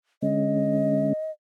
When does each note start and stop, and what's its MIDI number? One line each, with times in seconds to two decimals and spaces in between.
0.22 1.13 50
0.22 1.13 56
0.22 1.13 61
0.22 1.31 75